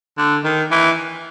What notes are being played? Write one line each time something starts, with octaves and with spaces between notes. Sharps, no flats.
D3
D#3
E3